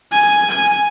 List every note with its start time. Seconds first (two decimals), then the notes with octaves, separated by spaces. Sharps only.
0.12 G#5
0.50 G#5